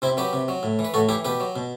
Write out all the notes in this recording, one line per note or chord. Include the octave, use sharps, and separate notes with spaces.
C3 C4 E4
F#3 G4 B4
C3
F#3
A2
E3
B4
A2 F#4 A4
E3 E4 G4
B2 G4 B4
F#3
B2